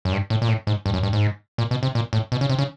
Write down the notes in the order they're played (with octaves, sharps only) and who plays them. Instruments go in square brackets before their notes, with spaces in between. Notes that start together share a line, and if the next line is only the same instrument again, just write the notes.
[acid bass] F#2
G2
A2
A#2
A2
G#2
G2
F#2
G2
G#2
A#2
B2
C3
A#2
A2
B2
C#3
C3
C#3